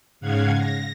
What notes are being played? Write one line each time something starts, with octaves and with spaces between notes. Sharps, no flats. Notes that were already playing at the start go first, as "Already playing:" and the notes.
G#2 C#3 F5 F#5 G#6
A#6